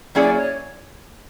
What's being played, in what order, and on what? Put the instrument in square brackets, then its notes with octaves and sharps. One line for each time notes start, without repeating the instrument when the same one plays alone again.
[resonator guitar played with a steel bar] F#3 A#3 C#4 E4 G#4 [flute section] D5
[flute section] C#5